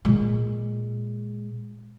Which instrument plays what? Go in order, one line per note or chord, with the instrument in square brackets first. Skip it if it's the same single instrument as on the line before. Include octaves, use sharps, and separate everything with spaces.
[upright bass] A#2 G#3